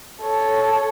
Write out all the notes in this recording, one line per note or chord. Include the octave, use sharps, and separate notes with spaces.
A4 C#5